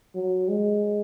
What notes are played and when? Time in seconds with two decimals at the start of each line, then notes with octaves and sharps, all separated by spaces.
0.15 F#3
0.49 G#3